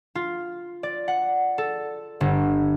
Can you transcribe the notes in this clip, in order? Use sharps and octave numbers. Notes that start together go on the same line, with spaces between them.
F4
D5
F#5
A4
G1